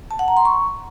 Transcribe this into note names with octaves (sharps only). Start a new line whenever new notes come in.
A5
F#5
A#5
C6
C#6